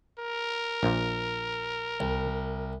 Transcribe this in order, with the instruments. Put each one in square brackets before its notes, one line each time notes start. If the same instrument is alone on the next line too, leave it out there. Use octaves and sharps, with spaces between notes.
[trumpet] A#4
[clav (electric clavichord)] A#1 A#2
[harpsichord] C2